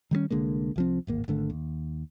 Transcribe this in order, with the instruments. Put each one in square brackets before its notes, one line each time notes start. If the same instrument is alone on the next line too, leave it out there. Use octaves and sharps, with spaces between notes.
[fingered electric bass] D#3 G3 G#3 C#4
C2 D3 G#3 A#3
C2 F3 C4
D1 G#1 A#3
G#1 D3 A3
D#2